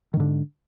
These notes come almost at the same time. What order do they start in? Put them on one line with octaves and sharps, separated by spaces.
D#3 G#2 D3